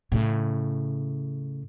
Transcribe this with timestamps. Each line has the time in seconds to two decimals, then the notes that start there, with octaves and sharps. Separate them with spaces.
0.12 A2 C#3